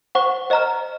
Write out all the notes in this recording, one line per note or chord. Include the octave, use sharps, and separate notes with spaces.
C5 F#5 C#6
C5 D#5 A#5 F6